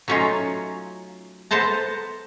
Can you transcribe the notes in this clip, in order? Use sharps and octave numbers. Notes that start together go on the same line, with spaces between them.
F#3 A3 C#4 D#4 F4
B3 A4 C5 A5 A#5